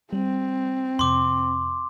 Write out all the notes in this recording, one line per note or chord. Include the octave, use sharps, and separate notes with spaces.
G3 C4
F2 C3 C6 D6